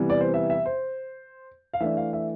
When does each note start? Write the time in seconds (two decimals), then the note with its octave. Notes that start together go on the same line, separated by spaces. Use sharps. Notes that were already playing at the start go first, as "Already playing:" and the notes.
Already playing: C3 E3 G3 B3
0.10 D5
0.21 C5
0.34 E5
0.50 E5
0.66 C5
1.74 F5
1.80 E3 A3 D4 E5
1.97 F5
2.13 E5